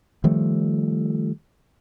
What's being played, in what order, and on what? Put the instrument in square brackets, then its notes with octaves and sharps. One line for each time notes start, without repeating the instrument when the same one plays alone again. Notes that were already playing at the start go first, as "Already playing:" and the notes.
[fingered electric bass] D#3 F3 G3 A3